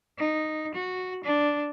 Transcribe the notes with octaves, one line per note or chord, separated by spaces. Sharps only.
D#4
F#4
D4